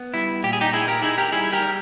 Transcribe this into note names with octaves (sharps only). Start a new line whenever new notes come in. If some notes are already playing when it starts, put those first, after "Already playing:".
Already playing: B3
G3 E4
A#2 G4
G#4
D#4 G4
D#4 E4 G#4
G4 A#4
D#4 E4 G#4
G4 A#4
G3 E4 G#4
G4 A#4
G3